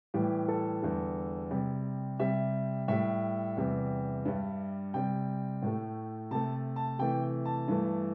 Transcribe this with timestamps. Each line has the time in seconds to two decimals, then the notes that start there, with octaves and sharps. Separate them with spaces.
0.14 A2 E3 G3 G4
0.48 A4
0.82 E2 D3 G3
1.51 C3 G3
2.20 C3 G3 E5
2.88 A2 G3 E5
3.57 E2 C3 G3
4.25 G2 G3
4.94 C3 G3 G5
5.62 A2 A3
6.31 C3 A3 A5
6.76 A5
6.99 C3 E3 A3 G5
7.45 A5
7.68 G2 E3 A3